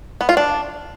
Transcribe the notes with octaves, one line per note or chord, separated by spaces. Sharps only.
B3
F4
D4